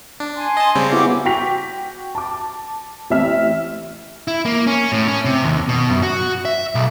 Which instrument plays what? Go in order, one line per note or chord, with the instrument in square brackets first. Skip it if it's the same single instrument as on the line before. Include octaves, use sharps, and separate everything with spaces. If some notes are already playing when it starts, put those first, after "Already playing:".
[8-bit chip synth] D4
[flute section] G#5 C6
[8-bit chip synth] D#5 A5
C#3 G3 C4
[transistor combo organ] B3 E4 G4 [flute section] F#4 D6
[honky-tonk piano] F#4 G5 C#6 A#6 B6 F7
A5 D6
A1 C4 E5 F6
[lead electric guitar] E4
A#3
C#4
A2
C#4
C3
D#2
B2
F#2
F#4
E5
B1